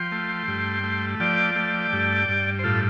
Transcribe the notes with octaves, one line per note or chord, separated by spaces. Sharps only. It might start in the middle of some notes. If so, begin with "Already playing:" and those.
Already playing: F3 G5 C6
A3
G2
A3
F3 D5 G5
A3
G2
G2
C5
A2 F4 A4